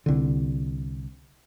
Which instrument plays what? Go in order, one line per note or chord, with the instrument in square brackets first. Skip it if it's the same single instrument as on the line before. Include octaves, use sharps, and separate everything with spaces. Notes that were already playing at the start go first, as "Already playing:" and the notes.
[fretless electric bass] C2 D3